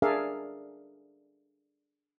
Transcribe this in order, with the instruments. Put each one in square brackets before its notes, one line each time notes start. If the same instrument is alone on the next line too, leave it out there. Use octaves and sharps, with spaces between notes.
[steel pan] D4 G#4 A#4 D5 E5 F5